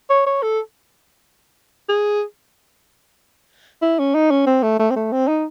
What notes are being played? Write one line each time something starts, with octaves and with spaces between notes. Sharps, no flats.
C#5
C#5
A4
G#4
E4
C#4
D#4
C#4
C4
A3
A3
C4
A3
C4
D#4